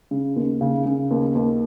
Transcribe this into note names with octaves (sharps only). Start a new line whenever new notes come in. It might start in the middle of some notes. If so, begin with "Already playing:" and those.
C#3
D#2
C#3
C#3
D#2
D#2